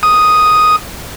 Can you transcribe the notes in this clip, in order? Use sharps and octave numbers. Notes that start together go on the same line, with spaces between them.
D#6